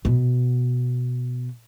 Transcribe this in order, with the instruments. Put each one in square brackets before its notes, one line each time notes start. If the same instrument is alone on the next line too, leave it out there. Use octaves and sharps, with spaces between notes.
[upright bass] B2 B3